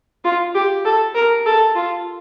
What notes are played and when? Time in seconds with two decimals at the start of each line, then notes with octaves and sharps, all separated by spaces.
0.24 F4
0.54 G4
0.85 A4
1.15 A#4
1.45 A4
1.75 F4